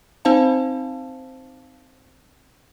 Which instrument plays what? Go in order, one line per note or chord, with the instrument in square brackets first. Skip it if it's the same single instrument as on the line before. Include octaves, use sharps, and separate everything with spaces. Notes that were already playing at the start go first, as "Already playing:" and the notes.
[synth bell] C4 D#4 C5 F5 A5